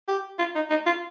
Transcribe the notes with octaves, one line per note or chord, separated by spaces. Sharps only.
G4
F4
D#4
D#4
F4